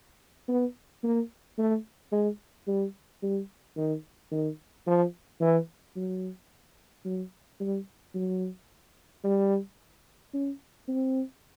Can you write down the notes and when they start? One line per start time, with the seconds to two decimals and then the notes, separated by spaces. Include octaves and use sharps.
0.48 B3
1.04 A#3
1.58 A3
2.12 G#3
2.68 G3
3.23 G3
3.77 D#3
4.31 D#3
4.87 F3
5.40 E3
5.96 F#3
7.05 F#3
7.60 G3
8.15 F#3
9.24 G3
10.34 C#4
10.88 C4